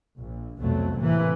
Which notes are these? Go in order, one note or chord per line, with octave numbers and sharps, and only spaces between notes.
A#1
C2 F2 B2 F#3 A3
A2 C3 E3 A#3